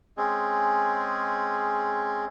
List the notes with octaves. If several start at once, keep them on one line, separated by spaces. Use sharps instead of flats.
G#3 C4 C#4 G#4